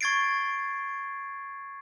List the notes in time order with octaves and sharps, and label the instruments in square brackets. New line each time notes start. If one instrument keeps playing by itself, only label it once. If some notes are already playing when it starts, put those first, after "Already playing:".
[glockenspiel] C#6 G#6 A6 C7 D7